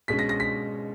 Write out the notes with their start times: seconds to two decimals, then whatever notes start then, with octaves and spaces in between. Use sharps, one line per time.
0.08 B2 G#3 C#4 B6
0.19 A#6
0.29 A#6
0.40 B6